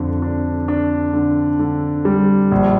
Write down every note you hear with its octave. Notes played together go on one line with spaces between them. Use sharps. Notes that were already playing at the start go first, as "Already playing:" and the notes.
Already playing: F2 D3 D4
D4
D4
D3
D3
G3
A#1